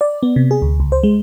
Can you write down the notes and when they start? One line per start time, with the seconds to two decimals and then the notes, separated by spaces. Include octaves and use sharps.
0.01 D5
0.23 B3
0.36 C3
0.51 G#4
0.62 D2
0.80 C#2
0.92 C5
1.03 G#3